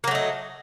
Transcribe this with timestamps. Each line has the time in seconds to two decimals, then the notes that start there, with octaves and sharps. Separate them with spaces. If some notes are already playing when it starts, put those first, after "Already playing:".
0.04 A#3
0.07 F#3
0.11 A3
0.15 D#4